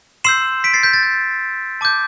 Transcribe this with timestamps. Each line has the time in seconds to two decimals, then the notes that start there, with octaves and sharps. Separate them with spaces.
0.24 C6 E6 G6 C7 E7
0.64 B6 D7
0.74 A6 C7
0.83 G6 B6
0.93 A6
1.03 G6
1.81 A5 D6 G6